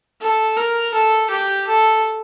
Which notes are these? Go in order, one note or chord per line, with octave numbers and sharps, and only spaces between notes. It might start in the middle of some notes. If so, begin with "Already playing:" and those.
A4
A#4
A4
G4
A4